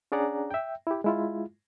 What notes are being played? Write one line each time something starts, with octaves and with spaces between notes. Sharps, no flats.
C#4 D4 G#4 D5 F#5 A#5
E5 G5
E4 G4
G#3 E4 F4